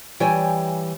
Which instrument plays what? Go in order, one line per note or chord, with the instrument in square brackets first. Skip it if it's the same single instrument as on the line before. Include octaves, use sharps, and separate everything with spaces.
[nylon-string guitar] E3 G3 C#5 G5 G#5